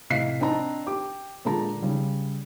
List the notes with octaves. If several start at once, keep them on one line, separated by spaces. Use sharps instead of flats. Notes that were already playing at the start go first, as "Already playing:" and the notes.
A2 C3 D#5 F5 B6 C7
C4 D4 D#5 A5 A#5
G4 D6
A#2 D3 G#3 A5 A#5
C#3 G3